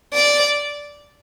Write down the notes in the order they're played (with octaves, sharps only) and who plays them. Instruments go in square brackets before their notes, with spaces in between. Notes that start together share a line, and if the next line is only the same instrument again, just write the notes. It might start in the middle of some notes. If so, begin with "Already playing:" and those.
[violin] D5